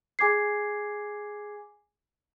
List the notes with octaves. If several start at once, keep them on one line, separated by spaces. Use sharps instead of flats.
G#4 G#5 D6 G#6 C7